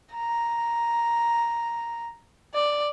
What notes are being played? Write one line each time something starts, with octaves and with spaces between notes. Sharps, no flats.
A#5
D5